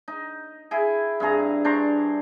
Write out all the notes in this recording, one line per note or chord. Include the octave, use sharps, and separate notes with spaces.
D#4
E4 G#4 G5
G2 C4 G#4 A#5
D4 C5 A#5 C#6